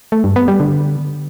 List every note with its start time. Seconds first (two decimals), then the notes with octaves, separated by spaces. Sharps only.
0.12 A3
0.24 G2
0.36 B3
0.48 G3
0.60 D3